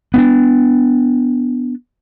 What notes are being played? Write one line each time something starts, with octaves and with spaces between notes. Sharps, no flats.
B3 C#4 D4